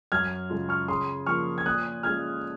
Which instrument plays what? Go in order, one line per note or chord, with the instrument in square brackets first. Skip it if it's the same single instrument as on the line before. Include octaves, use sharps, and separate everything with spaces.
[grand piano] F#2 F6 G#6
C#3 G#3 C#4 F4
C#6 F6
C#3 C6 D#6
F3 A#3 C#6 F6
G#6
A#2 D#6 F#6
G#3 C#4 F4 F6 G#6